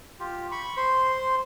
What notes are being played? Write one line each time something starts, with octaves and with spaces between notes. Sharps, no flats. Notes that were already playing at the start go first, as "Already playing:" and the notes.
F4 G4
B5 C#6
C5 C6